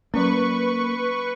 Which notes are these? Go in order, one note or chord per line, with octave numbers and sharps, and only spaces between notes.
F#3 A#3 C#4 B4 C#6